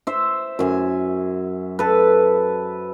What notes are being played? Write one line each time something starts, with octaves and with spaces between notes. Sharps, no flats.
C5 E5
F#2 G#5
A4 B4